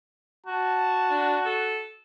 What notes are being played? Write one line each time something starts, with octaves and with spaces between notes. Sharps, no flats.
F#4 A5
D4
A4